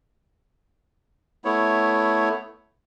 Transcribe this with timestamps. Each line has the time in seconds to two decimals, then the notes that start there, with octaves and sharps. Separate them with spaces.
1.45 A3 B3 E4 C#5